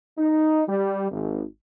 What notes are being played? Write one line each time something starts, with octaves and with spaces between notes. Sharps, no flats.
D#4
G3
G#1